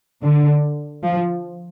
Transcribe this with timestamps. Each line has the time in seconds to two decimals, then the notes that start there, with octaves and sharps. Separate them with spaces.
0.22 D3
1.04 F3